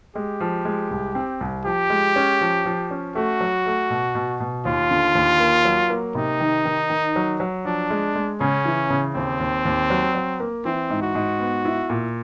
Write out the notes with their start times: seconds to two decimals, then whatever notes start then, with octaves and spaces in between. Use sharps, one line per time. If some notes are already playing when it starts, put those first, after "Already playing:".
0.15 G#3 G4
0.40 F3
0.65 G#3
0.91 C2
1.15 C4
1.41 C2
1.65 F3 G4
1.90 G#3
2.16 C#4
2.41 F3
2.66 F3
2.91 C#4
3.15 A3 F#4
3.41 F#3
3.66 A3
3.90 B2
4.15 B2
4.40 B2
4.65 D#2 F4
4.91 D3
5.15 D#2
5.40 A#3
5.65 F#3
5.90 A#3
6.15 C3 D#4
6.40 D#3
6.65 D#3
6.90 D#3
7.16 F#3
7.40 F#3
7.65 F3 D4
7.90 G#3
8.15 G#3
8.40 C#3 C#4
8.65 E3
8.90 C#3
9.15 D#2 C4
9.40 D#2
9.65 D#2
9.90 F#3
10.15 F#3
10.40 A#3
10.65 E3 C4
10.90 G#2
11.02 F#4
11.15 G#2
11.40 B3
11.65 E4
11.90 A#2